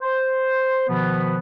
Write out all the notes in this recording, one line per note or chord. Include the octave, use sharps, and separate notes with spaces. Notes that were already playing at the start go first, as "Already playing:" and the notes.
C5
B2 D#3 F3 B3